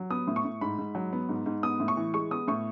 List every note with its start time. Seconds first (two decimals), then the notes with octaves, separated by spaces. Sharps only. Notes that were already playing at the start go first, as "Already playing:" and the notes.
Already playing: F#3
0.10 B3 D#6
0.27 A2
0.36 C#6
0.44 A2
0.61 G#2 B5
0.78 G#2
0.95 F#3
1.13 B3
1.29 G#2
1.46 G#2
1.63 B3 D#6
1.80 A2
1.88 C#6
1.97 E3
2.14 G#3 C#6
2.31 B3 D#6
2.48 A2 C#6